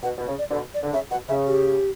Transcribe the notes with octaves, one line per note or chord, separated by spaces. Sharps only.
B2 F#5
B2
C#3
D5
B2 D3
D5
D3
C#3 E5
B2 F#5
C#3 E5
G4